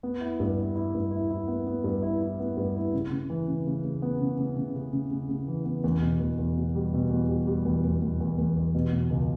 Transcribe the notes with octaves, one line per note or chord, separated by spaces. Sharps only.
B3
E4
G2
E4
E4
G2
E4
E4
B3
B3
G2
E4
E4
B3
G2
E4
C#3
C#3
E3
C#3
C#3
C#3
B3
C#3
C#3
C#3
C#3
C#3
C#3
C#3
E3
B3
E2
B2
E2
E2
B2
G3
B2
E2
G3
G3
E2
E2
E2
E2
E2
E2
B2
B2
C#2